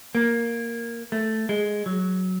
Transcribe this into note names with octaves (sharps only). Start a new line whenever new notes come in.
A#3
A3
G#3
F#3